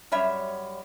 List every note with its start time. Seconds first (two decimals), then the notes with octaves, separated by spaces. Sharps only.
0.12 F#2 G3 C#5 E5